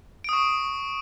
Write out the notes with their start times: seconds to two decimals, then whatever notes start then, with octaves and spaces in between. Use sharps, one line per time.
0.24 D7
0.29 D#6
0.33 C#6